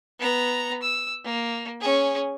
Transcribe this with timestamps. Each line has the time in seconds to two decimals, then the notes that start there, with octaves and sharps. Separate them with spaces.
0.20 B3 A#5
0.82 E6
1.25 A#3
1.81 C#4 G#4